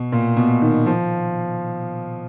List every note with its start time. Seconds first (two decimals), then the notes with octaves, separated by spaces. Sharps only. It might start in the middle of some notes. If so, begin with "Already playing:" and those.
Already playing: B2
0.12 A#2
0.37 B2
0.62 D#3
0.86 F3